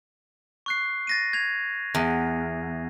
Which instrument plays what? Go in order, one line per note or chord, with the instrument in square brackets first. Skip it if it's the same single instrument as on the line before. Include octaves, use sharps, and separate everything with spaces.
[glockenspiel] C#6 F#6 C7
A6 A#6 D#7
G#6 F7
[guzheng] E2